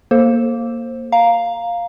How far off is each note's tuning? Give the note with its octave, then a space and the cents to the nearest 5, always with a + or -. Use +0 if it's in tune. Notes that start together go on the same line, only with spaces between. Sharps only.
A#3 +0 A4 +0 C5 +15
F5 +0 A#5 +0